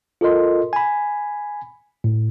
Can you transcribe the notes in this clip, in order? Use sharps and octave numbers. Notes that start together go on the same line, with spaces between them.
F4 A4 A#4 D#5 C6
G#5 B5
A2